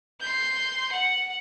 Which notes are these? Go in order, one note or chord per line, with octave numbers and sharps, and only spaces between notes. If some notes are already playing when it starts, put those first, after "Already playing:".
C6 G6
F#5